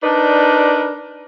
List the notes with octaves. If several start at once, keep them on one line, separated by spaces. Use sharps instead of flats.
D4 D#4 A#4 B4 D5